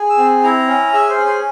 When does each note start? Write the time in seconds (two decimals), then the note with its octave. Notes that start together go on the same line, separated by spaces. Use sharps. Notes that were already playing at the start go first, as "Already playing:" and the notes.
Already playing: G#4
0.10 E6
0.17 C4
0.43 E4 A#5
0.68 C#4
0.93 G#4 E5
1.10 C5
1.18 C#4
1.26 C5